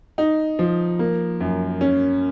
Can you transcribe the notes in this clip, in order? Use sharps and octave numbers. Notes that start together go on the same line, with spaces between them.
D#4
F3
A#3
F#2
C#4